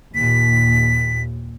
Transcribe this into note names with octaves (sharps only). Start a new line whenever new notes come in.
D#2 A#2 B6